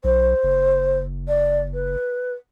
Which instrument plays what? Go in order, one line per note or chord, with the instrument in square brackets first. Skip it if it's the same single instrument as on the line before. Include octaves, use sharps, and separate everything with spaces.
[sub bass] B1 [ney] C5
[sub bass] F#1
[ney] D5
B4